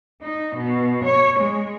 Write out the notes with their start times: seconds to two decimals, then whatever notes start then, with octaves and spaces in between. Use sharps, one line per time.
0.23 D#4
0.58 B2
1.04 C#5
1.41 G#3